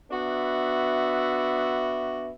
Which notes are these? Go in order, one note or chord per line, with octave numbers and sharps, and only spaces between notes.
B3 D4 F#4 E5